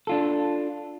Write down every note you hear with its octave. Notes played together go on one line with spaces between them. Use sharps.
D4 F4 A4